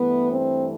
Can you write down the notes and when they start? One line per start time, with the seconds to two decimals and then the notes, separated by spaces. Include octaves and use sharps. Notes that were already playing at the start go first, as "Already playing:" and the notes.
Already playing: G2 E3 A3 B3
0.29 C4